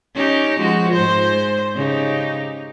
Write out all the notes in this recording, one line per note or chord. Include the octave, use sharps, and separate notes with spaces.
C#4 D#4 G4
F3 G#3 F#4
G#2 C5
C#3 D#4 G4